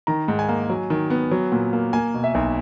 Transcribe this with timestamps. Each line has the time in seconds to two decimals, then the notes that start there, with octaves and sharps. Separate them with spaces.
0.07 D#3 A#5
0.28 G#2
0.39 G#5
0.49 A#3
0.70 F#3
0.90 D#3
1.10 B3
1.32 F#3
1.52 A#2
1.73 A#3
1.93 A#3 G#5
2.14 B2
2.24 E5
2.34 B1